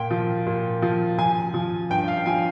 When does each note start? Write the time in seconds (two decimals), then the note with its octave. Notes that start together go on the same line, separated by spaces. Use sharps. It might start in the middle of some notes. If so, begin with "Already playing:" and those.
Already playing: A#2 G5
0.11 F3
0.46 A#2
0.82 F3
1.18 F3 G#5
1.54 F3
1.90 G2 G5
2.08 F5
2.26 F3 G#5